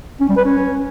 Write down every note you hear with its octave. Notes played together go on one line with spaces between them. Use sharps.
C#4
G3
B4
C#4